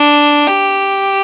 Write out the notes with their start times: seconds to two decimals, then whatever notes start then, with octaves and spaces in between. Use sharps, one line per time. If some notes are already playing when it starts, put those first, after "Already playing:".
Already playing: D4
0.47 G4